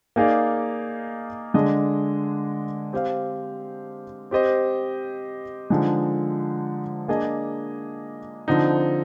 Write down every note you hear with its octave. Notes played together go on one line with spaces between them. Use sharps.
A#3 D#4 G#4 D5 F5
D3 G#3 D4 G#4 D#5
C4 G4 C5 F5
C4 G4 C5 D#5
D3 F3 G#3 D#4
A#3 D4 G#4 D#5
D3 F3 C4 D#4